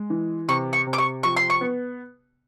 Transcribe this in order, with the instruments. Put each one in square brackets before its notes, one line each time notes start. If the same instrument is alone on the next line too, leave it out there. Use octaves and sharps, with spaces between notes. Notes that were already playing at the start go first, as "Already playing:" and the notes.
Already playing: [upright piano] G#3
E3
[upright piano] C3 [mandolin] C#6
[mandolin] C#6
[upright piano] C3
[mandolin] D6
C#6
[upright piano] F3 [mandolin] C#6
[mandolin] C6
C#6
[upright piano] B3